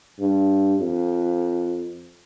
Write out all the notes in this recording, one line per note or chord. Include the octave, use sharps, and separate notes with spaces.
G2
F2